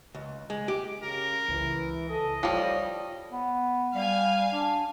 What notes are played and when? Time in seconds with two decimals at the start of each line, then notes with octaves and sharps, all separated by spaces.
0.15 C#2
0.50 G#3
0.68 G4
1.03 C#3 A#4
1.48 C#2 E3
2.10 A4 D#5
2.43 F3 G3 D#4 C#5
3.31 B3
3.94 G3 F5 G#5
4.52 D4